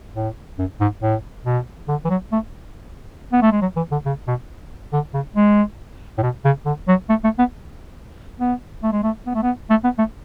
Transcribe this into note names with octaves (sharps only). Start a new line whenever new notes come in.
A2
F#2
G#2
A2
B2
D3
E3
F#3
A3
B3
A3
G#3
F#3
E3
D3
C#3
B2
D3
C#3
G#3
A2
B2
C#3
D3
F#3
A3
A3
B3
B3
A3
G#3
A3
B3
A3
B3
A3
B3
A3